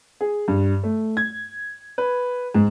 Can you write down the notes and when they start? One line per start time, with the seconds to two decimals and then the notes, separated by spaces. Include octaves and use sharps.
0.21 G#4
0.48 G2
0.83 A3
1.17 G#6
1.98 B4
2.55 G#2